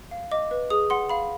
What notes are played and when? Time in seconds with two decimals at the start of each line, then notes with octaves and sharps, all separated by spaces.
0.11 F5
0.31 D#5 D6
0.51 B4
0.70 G#4 D#6
0.90 F#5 C6
1.09 F5 B5